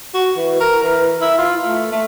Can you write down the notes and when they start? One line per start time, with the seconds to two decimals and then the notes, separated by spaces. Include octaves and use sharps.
0.14 F#4
0.37 E3
0.60 A#4
0.82 E3
1.21 E4
1.38 F4
1.65 A3
1.92 A3